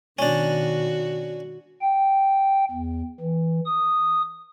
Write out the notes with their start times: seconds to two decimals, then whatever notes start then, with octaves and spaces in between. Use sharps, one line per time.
0.19 B2 D#3 C#4 D4 F#4
1.82 G5
2.71 E2
3.21 E3
3.66 D#6